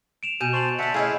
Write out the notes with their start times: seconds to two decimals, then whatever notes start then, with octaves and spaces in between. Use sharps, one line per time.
0.23 D7 E7 F7
0.41 B2 G#5 G6 D#7
0.53 C5 A5 C#6 F#7
0.79 D3 D4 E5 F#5 A5
0.94 A3 C#4 E4 G#4 D#5 F5